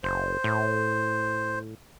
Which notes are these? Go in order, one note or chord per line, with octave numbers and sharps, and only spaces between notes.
F#1 C5
A2